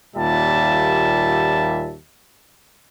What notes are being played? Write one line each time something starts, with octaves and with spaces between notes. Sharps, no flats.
D#2 A#2 G3 F4 E5 A5